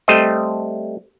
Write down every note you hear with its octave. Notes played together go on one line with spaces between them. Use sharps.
G3 A3 C4 C5 D#5